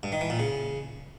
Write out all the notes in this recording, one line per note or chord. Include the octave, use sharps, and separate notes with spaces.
G2
D#3
E3
A#2
C#3